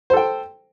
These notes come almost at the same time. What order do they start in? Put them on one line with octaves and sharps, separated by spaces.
C5 A4 G5